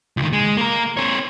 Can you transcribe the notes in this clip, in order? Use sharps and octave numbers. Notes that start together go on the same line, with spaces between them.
C#2 D#3
G#3
A#3 A#4
C4 C#5